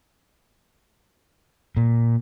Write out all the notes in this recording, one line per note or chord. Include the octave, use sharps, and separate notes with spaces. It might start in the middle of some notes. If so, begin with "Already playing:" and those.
A#2